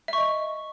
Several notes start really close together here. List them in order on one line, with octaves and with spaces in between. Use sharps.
E5 C#6 D#5